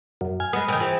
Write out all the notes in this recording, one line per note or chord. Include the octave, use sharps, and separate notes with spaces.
F#2
G#5 F6
G#3 B3 D#6
B2 D#3 G5 G#5
E3 F4 G#4 C5